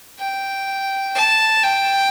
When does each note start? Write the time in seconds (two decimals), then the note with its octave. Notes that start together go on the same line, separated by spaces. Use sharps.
0.19 G5
1.15 A5
1.63 G5